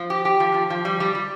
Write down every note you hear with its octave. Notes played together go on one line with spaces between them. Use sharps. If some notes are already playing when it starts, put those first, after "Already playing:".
Already playing: F3
G4
G4
F3
F3
F3
G3
G3
G3